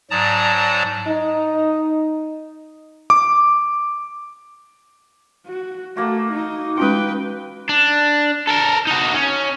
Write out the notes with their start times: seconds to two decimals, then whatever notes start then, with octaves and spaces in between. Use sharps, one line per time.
0.11 G#2 F#3 D5 A5 A#5 D#6
1.07 D#4
3.10 D6
5.46 F#4
5.97 A3 A#3 F#4
6.32 D#4
6.78 G#3 C#4 F4 B4 G5
7.69 D4
8.48 A4 A#4
8.87 D#4 F#4
9.14 C#4